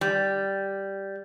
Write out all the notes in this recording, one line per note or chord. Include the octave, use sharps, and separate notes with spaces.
G3